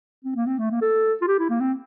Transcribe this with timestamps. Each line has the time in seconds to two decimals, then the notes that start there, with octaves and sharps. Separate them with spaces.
0.25 C4
0.36 A#3
0.47 C4
0.58 A3
0.71 A#3
0.81 A4
1.21 F4
1.27 G4
1.39 E4
1.49 A#3
1.60 C4